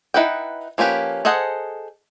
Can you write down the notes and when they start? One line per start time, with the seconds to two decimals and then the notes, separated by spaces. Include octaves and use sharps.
0.14 D#4 E4 B4 F#5 G5
0.78 F3 A#3 C#4 G4 B4
1.25 G#4 A4 C5 D#5 F#5